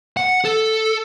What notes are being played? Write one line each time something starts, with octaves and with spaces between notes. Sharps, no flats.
F#5
A4